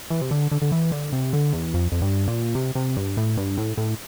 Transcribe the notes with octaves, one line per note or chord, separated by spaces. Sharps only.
E3
C3
D3
D3
D3
E3
D3
C3
D3
E2
F2
F2
G2
A#2
C3
C3
G2
A2
G2
A2
A2